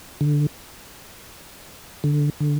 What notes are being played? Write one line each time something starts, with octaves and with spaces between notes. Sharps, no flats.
D3
D3
D3